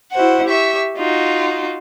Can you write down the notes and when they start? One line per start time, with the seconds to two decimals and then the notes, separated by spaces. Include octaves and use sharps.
0.12 E4 F#4 C5 F#5
0.46 G4 E5 C#6
0.97 D#4 F4 F#4